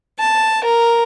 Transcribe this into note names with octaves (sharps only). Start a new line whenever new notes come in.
A5
A#4